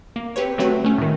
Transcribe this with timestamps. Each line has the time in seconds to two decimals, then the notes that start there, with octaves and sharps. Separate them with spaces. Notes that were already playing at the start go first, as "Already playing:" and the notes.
0.16 A#3
0.36 C4 G4 B4 C#5
0.58 D3 F#3 A3 C4 F#4 B4
0.84 A3 C#4
0.98 A2 D#3